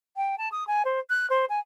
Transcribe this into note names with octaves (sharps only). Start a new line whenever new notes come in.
G5
A5
D#6
G#5
C5
F#6
C5
G#5